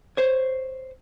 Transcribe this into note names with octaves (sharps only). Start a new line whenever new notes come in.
C5 C#5